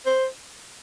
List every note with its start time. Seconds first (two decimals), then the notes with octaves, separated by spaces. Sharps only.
0.06 C5